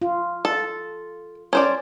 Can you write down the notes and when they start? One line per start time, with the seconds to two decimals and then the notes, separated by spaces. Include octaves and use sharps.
0.02 F4
0.45 A4
1.53 C#4 C5 D5